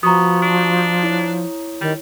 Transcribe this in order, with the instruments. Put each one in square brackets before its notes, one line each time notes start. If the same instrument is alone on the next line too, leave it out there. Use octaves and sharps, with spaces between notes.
[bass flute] F3 [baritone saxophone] B3 [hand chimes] F#4 C#6 [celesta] A#5 D#6
[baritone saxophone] D4
[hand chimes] E4 C#5
[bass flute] D#3 [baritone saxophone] G3